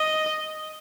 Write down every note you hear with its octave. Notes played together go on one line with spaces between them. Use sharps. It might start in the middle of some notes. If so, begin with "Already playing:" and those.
Already playing: D#5